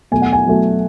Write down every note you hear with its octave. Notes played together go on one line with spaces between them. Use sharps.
B2 F#3 A3 G#5
F#5
G#5
B2 F#3 A3